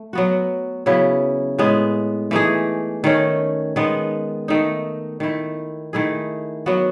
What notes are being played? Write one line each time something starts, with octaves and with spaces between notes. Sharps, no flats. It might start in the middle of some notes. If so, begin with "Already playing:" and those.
Already playing: A3
F#3 B3 F#4
C#3 F#3 B3 E4
A2 G#3 B3
E3 A3 D#4 G#4
D#3 A3 C#4
D#3 G#3 B3
D#3 A3 D#4
D#3 A3 E4
D#3 A3 E4 G#4
F#3 B3 F#4